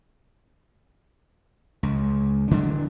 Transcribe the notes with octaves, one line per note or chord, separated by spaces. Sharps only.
C#2
D3 F#3 D4